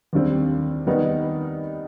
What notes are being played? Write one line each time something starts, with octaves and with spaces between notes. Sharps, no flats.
D#2 D3 G3 C4
D#3 G3 B3 D#4